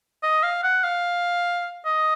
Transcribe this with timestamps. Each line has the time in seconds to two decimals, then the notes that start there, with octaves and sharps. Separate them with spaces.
0.23 D#5
0.43 F5
0.63 F#5
0.84 F5
1.85 D#5